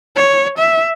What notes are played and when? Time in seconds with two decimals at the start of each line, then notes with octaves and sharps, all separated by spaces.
0.16 C#5
0.58 E5